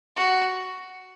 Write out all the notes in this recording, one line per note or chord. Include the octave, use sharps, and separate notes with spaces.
F#4